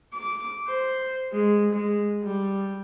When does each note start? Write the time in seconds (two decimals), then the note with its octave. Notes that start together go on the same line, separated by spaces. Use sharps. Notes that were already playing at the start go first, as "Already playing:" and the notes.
0.14 D6
0.67 C5
1.32 G#3
1.72 G#3
2.23 G3